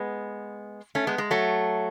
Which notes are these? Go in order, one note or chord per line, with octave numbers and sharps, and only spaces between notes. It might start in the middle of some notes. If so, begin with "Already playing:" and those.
Already playing: G#3 B3
A3 C#4
G#3 B3
G#3
F#3 A3